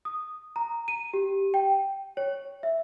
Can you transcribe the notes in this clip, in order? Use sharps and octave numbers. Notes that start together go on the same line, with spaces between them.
D#6
A#5
D#7
G4
G5
C#5
E5